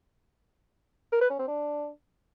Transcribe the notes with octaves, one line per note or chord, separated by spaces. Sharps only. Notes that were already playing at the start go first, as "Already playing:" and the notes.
A#4
B4
C#4
C4
D4